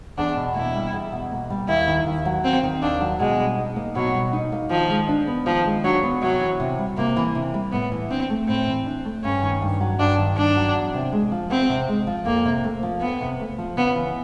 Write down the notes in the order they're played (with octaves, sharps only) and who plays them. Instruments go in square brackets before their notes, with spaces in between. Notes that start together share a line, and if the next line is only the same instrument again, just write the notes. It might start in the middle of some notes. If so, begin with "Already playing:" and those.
[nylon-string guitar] E2 [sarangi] D4
[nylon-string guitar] B2
[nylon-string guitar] A#3 [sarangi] E4
[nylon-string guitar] G3
E2
B2
A#3
G3
[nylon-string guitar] D#2 [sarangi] E4
[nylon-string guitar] D#3
D#2
F#3
[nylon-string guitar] D#2 [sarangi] C4
[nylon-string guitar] D#3
[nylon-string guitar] D#2 [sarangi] D4
[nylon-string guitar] F#3
[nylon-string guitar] B2 [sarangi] G#3
[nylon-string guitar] G3
D#4
A#3
[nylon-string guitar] B2 [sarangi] F#3
[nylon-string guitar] G3
D#4
A#3
[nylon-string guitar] D#3 [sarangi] F3
[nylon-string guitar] G#3
D4
B3
[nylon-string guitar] D#3 [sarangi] F3
[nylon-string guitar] G#3
[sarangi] F#3 [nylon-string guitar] D4
[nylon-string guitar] B3
[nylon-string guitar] C3 [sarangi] F#3
[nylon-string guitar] E3
C3
G3
[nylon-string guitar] C3 [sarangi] A#3
[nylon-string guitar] E3
C3
G3
[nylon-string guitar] A2 [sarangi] B3
[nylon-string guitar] E3
[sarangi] C4 [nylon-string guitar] D4
[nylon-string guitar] A3
[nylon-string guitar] A2 [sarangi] C4
[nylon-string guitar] E3
D4
A3
[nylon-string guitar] G2 [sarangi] C#4
[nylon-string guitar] D#3
G2
F#3
[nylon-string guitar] G2 [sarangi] D4
[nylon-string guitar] D#3
[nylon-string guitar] G2 [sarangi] D4
[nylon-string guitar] F#3
E2
C3
G#3
F3
[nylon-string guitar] E2 [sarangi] C4
[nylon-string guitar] C3
G#3
F3
[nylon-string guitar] F2 [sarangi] A#3
[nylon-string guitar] C3
A3
F3
[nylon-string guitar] F2 [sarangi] B3
[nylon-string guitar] C3
A3
F3
[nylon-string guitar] C#3 [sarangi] B3
[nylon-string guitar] E3